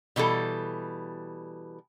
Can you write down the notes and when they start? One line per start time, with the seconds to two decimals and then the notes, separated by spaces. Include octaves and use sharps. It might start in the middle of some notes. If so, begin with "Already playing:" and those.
0.16 B2 E3 G3 A4